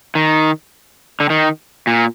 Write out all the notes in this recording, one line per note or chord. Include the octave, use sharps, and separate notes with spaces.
D#3
D3
D#3
A#2